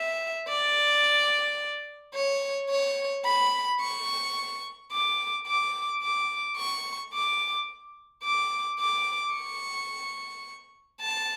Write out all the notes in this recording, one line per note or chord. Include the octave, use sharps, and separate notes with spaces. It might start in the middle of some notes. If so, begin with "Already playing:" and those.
Already playing: E5
D5
C#5
C#5
B5
C#6
D6
D6
D6
C#6
D6
D6
D6
C#6
A5